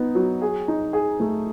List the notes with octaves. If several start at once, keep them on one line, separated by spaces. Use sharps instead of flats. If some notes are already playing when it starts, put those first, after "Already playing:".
Already playing: B3 D#4
F#3
G#4
D#4
G#4
A3